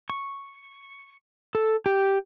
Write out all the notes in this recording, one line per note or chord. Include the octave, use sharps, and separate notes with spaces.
C#6
A4
G4